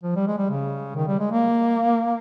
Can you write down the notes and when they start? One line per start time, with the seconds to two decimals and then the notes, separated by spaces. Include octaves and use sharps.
0.03 F3
0.16 G3
0.28 G#3
0.38 G3
0.50 C#3
0.96 D#3
1.08 G3
1.19 G#3
1.32 A#3